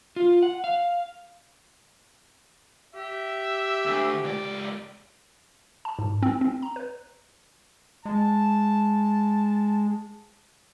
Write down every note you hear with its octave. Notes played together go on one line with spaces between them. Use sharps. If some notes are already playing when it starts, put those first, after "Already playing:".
F4
F#5
F5
G4 E5
D2
C#2 D5
A5
G#2
C4
C4
A#5
B4
G#3 A5